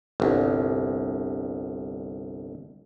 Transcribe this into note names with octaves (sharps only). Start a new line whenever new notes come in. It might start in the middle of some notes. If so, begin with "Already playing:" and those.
G1 C2